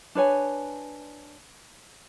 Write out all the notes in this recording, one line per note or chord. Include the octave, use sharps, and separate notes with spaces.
D4 B4 C#5 G#5